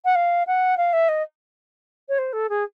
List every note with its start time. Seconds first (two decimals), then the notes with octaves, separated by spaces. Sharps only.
0.05 F#5
0.15 F5
0.47 F#5
0.77 F5
0.93 E5
1.09 D#5
2.09 C#5
2.18 C5
2.33 A4
2.49 G#4